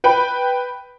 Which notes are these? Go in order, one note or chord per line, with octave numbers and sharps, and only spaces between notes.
B4 G5 B5